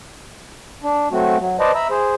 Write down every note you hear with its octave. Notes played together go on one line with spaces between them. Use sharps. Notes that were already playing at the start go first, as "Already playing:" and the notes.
D4
F#3 A3 C4 F#4
F#3
B4 C5 D5 D#5 A5
E5 A#5 B5 E6
G#4 C5